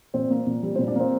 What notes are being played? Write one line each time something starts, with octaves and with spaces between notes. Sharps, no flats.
A#2 C4 C5
A#3
A#2
G3
C4 C5
A#2
D4 D5
A#3 C4 C5